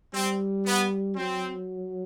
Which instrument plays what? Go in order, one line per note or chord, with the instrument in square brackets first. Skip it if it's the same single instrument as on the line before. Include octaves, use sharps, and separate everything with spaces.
[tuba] G3 [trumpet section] C4
[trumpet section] B3
[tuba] F#3 [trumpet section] C4